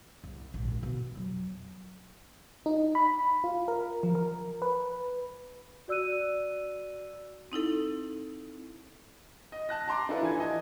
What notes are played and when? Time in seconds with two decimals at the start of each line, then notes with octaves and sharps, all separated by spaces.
0.24 C2
0.54 A#1 G#2
0.68 G3 A#3
0.83 B2
1.15 F2 F#3
2.66 D#4
2.95 B5
3.44 F4
3.68 A#4
4.03 F3
4.15 A#4
4.62 B4
5.88 F#4 D5 E6 F#6 D#7
7.52 C4 D#4 E4 A4
9.52 D#5
9.69 A5 F#6 A#6
9.88 A5 A#5 C6 D6
10.09 D4 E4 F4 A4 B4 D5
10.23 E3 G#5 G#6
10.40 D#5 A5